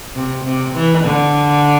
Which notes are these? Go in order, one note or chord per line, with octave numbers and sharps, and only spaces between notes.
C3
C3
E3
D3